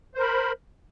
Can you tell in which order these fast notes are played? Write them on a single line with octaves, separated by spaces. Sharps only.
C5 A#4 B5